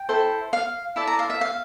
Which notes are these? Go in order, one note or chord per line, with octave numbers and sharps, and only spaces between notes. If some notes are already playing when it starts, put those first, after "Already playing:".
Already playing: G5
E4 A4 C5
F5
E4 A4 D5 A5
A#5
F5
E5
F5